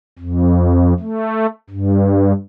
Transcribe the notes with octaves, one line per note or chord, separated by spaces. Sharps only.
F2
A3
G2